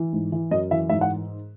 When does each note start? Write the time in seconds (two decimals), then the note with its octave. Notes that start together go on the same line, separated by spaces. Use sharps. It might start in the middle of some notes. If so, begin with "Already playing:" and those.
Already playing: E3
0.13 G#2
0.32 E3
0.51 F#2 D#5
0.71 E3 E5
0.89 G#2 E5
1.01 F#5